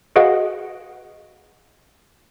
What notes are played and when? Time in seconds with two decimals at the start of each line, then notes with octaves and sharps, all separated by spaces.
0.16 F#4 G#4 B4 D#5 F5 F#5